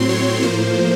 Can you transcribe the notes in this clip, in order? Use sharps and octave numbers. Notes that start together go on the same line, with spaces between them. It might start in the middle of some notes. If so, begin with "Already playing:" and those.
Already playing: A2 F#3 C4 C6
C#5
A2 F3 A#3 C5